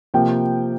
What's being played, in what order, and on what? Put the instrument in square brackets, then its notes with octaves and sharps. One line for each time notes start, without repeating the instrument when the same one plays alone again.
[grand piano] C3 F3 A#3 G5